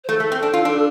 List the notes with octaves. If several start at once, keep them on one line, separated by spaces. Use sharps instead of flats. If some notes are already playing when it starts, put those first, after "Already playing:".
C5
A3 A4
A3
A4
C4
D4
F4
D4